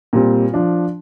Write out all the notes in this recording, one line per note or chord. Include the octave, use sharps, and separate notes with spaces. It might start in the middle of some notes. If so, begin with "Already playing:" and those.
A#2 G3 C4
F3 D4 F4